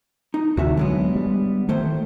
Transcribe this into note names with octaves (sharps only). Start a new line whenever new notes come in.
D#4
D2 C3 D#3 F#4 E5
D3 F#3 G#3 B3
G3
A2 D#3 A3 C5